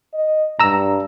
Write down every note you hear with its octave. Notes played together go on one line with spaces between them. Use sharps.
D#5
G2 A#5 E6